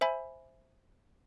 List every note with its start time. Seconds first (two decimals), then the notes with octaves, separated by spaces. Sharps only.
0.01 C5 E5 G#5 B5